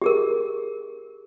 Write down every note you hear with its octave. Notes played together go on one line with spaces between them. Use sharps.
G4 G#4 A#4